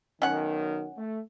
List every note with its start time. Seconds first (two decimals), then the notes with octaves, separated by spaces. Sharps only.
0.22 B1 F#2 D#3 C#4 F#5
0.97 A3